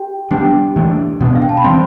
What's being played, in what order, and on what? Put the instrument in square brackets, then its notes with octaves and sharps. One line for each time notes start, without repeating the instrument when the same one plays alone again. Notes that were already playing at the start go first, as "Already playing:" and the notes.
Already playing: [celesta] G4 G5
[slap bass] D3 G3 B3 D4 [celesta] G4 G5
[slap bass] E3 A3 D4
B2 B3 D4
[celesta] F5
G5
A5
B5
[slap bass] E3 G3 C4 [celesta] C5 C6